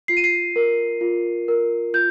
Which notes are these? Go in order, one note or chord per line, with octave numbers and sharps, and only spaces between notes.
F4 C7
D#7
C7
A#4
F4
A#4
F4 G6